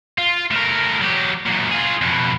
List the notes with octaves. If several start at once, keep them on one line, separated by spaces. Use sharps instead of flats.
F4
A2 A#4
F#3 G4
F#2 A#2
F4 G#4
F2 B2